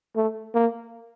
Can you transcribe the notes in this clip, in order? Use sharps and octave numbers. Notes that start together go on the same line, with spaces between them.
A3
A#3